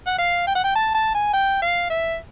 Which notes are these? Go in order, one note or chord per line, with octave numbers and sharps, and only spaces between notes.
F#5
F5
G5
F#5
G5
A5
A5
G#5
G5
F5
E5